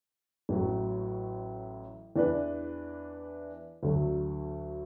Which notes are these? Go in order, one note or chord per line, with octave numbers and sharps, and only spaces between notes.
A1 A2 F#3
E2 E3 D4 B4
D2 D3 F#3